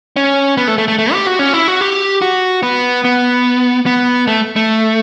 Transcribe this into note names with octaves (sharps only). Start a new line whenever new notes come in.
C#4
B3
A3
A3
A3
A3
G4
F#4
C#4
E4
F#4
G4
F#4
B3
B3
B3
A3
A3